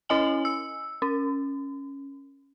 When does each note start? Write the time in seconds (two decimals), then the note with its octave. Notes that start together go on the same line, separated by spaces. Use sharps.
0.09 C#4 E4 D#5 G#5 F#7
0.45 E6
1.02 C#4